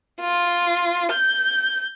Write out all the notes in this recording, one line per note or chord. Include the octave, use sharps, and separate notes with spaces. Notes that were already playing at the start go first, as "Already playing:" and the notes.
F4
G6